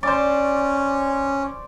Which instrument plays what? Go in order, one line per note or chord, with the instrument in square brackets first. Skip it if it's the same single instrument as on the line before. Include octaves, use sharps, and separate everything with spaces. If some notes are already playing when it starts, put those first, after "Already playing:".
[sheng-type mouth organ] C#4 [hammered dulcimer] C5 D5